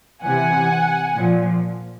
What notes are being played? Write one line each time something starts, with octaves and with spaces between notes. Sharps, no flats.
C3 E3 F#5 G#5
A#2 F3